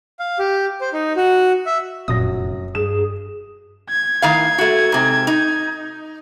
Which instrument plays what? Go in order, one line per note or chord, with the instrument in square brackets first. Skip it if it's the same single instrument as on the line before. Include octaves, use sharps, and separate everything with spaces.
[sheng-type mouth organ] F5
G4
C5
D#4
F#4
E5
[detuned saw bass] F1 [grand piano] F#2 F#4 A#6 [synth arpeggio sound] A#2 D#6
[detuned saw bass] G2 [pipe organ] G#4 [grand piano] E7
[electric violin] G#6
[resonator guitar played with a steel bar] A2 D#3 F5
A3 F#4
G#2 C3
D#4